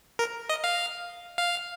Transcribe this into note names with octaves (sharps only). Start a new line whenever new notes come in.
A#4
D#5
F5
F5